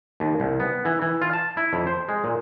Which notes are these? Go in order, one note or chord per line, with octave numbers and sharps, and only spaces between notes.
D#2
C2
B3
E3
E3
F4
A5
E4
F2
C5
G#3
A#2